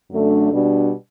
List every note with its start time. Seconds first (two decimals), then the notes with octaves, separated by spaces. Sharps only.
0.10 F#2 D3 A3 D4
0.51 B2 G3 D4